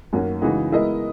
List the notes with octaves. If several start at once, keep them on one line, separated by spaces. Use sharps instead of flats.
F#2 D#3 A#3 C#4 F#4
C#3 E3 G#3 D#4 F#4
G#3 B3 E4 A#4 D#5